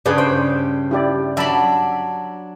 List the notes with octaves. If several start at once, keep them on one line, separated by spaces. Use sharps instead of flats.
G2 C#3 G#4 B4 D5
C5 G5
E4 G4 D5
F#3 D4 E5 A5 B5